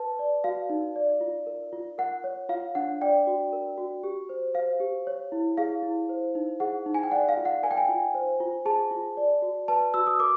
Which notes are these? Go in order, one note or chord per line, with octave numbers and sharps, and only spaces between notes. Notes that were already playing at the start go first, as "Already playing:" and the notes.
Already playing: B4 A5
D5
F#4 F5
D#4
D5
F4
A#4
F4
A#4 F#5
C#5
F4 F5
D4 F#5
D5 G5
F#4
A#4
F#4
G4
C5
C5 F5
G4
C#5
E4
G#4 F5
E4
C5
D#4
G#4 F#5
D#4
G#5
G5
D5 F#5
F5
F4
F#5
A#4 G#5
G5
G#5
F4
C5
F4
G#4 A5
F4
D5
F#4
B4 A5
F#4 E6
D#6
A#4 D6